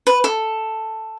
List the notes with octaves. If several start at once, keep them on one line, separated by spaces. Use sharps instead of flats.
B4
A4